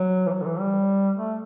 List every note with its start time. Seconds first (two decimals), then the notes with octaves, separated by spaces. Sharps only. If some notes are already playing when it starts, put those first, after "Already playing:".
Already playing: F#3
0.27 E3
0.31 F#3
0.42 D3
0.46 E3
0.59 G3
1.16 A3